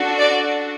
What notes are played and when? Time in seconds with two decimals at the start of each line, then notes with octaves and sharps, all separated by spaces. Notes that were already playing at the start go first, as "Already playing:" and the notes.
Already playing: D4 F#4 A4
0.18 D5